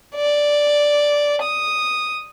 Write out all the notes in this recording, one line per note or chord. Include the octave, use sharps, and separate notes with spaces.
D5
D#6